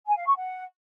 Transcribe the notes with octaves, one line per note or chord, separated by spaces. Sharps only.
G#5
F5
C#6
F#5